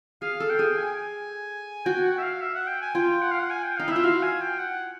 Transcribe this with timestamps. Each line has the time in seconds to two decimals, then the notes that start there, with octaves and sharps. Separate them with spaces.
0.22 G#4 F5
0.40 A4
0.50 G5
0.59 G#4
0.77 G#5
1.85 F#4 G5
2.04 F#5
2.18 E5
2.23 F5
2.41 E5
2.55 F#5
2.67 G5
2.81 G#5
2.95 F4 G5
3.22 F#5
3.31 F5
3.39 F#5
3.50 G#5
3.63 G5
3.77 D#4 F5
3.88 E4 E5
3.96 F4
4.04 F#4 F5
4.23 G#5
4.41 G5
4.59 F#5